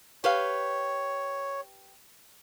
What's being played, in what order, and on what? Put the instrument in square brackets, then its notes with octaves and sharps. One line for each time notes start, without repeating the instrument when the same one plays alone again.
[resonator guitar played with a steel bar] G4 B4 F5 [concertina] C#5